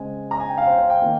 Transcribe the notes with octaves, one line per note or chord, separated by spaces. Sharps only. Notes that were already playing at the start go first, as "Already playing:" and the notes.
Already playing: C#3 G#3 C4 G#5
A#5
G#5
G5
F5
C5
C5
G5
D#3 A#3